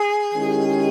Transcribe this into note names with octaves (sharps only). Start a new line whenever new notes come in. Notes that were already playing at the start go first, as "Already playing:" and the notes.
Already playing: G#4
D#3 G#3 C#4 E4 G4